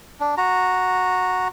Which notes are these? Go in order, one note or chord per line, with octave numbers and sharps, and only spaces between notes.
D4
F#4 A#5